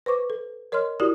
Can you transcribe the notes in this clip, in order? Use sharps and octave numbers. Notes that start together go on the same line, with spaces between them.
B4 C5 C#6 D6
A4
A#4 C#5 D#5 C6 F6
E4 F#4 G4 A#4 D5 D#6